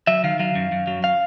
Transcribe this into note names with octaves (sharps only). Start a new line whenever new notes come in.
F#3 E5
D#3 F5
F#3 F5
F#2
F#2
F#3
F5